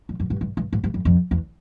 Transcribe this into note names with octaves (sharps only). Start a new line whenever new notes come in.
F2
F#2
G2
G2
G2
G#2
G2
F2
F2
E2